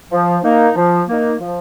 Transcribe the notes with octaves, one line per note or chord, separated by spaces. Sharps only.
F3
A#3 D#4
F3
A#3 D#4
F3